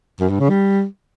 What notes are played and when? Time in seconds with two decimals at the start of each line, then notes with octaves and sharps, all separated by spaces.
0.20 F#2
0.29 G2
0.40 C#3
0.50 G3